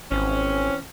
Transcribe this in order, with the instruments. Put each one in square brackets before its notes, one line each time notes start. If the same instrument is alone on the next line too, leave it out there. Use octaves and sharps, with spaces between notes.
[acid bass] G#1 [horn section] E3 C4 C#4